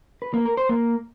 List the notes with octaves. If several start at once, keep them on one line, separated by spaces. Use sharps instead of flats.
B4
A#3
A#4
C5
A#3